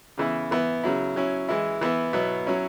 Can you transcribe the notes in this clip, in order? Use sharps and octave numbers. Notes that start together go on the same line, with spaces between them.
C#3 E3 B3 E4
E3 B3 E4
C#3 F#3 E4
F#3 C#4 E4
E3 G#3 E4
E3 B3 E4
B2 F#3 B3 E4
F#3 C#4 E4